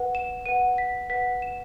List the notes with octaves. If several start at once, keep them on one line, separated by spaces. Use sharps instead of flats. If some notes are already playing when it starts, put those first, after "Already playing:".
Already playing: B4 F#5
E7
B4 F#5 D#7
B6
B4 F#5 B6
E7